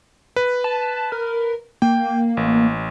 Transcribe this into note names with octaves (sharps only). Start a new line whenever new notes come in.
B4
A5
A#4
A#3 G5
A1